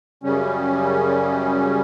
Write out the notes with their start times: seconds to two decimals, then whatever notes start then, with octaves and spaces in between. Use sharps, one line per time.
0.23 F#2 C#3 G3 C#4